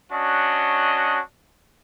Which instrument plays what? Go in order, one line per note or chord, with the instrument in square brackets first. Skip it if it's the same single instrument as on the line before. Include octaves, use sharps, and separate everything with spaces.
[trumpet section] C#4 D4 F#4 D#5